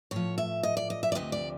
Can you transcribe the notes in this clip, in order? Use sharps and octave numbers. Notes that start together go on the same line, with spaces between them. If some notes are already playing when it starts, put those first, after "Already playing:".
A2 F3 C#5
E5
D#5
D5
D#5
E5
D5
D2 C3 F3 D#5
D5